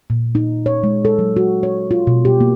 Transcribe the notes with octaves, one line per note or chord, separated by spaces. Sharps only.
A#2
D#4
C#5
G#3
A4
F#3
F#4
C#5
F4
B2
G4
A#3